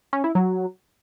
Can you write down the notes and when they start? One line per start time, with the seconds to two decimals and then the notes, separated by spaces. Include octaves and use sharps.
0.13 C#4
0.24 E4
0.35 F#3